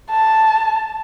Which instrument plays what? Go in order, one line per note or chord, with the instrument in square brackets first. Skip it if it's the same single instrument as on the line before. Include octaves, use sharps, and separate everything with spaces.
[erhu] A5